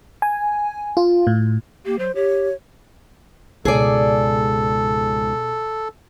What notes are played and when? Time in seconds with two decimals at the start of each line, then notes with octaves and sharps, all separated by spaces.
0.22 G#5
0.97 F4
1.27 A2
1.85 A#3 G4
1.99 F#3 C5
2.15 G4 C#5
3.65 C#2 G#2 B2 G#4 A4 D5